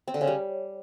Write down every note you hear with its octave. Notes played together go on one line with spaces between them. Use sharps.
C4
D3
C#3
G3